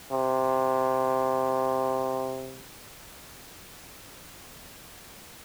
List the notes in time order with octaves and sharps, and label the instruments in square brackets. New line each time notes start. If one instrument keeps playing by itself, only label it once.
[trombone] C3